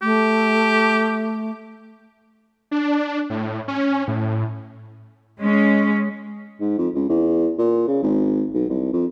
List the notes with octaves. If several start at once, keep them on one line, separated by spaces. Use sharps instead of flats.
A3 G4
D4
A2
C#4
A2
G#3 C#4
G#2
F2
C#2
E2
A#2
C#3
G#1
B1
C2
F2